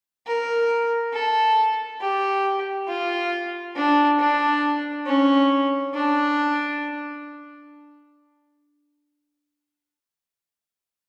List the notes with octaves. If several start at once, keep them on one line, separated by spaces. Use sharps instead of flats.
A#4
A4
G4
F4
D4
D4
C#4
D4